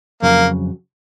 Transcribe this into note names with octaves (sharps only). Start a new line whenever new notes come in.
F2 C#3 F#3 A#3